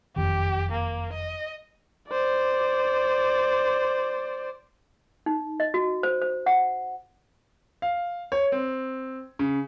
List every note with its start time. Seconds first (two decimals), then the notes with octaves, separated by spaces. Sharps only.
0.16 F#1 F2 D#3 G4
0.71 A#3
1.13 D#5
2.09 C5 D5
5.26 D#4
5.60 D#5
5.74 F#4
6.03 C5
6.21 C5
6.46 F#5
7.82 F5
8.32 C#5
8.52 C4
9.39 C#3